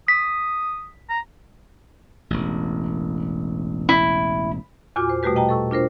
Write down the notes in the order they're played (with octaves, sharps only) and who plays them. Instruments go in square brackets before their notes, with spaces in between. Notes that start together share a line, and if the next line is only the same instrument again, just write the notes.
[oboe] D#6 [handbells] B6
[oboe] A#5
[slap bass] E1 A1
[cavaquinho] E4
[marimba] E2 A#2 F4 F#4 G#5 D6
C5
B2 G3 A3 F#4 G4 B4
D#5 G5 A5 A#5
A4 C#6 E6
D4 F4 A#4 C5